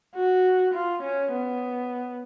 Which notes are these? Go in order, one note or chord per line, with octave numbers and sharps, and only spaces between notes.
F#4
F4
C#4
B3